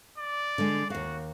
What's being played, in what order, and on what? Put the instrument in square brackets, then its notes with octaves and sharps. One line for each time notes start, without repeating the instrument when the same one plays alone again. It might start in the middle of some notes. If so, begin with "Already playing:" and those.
[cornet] D5
[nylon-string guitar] D3 G#3
[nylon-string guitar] D#2 F5 [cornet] F#4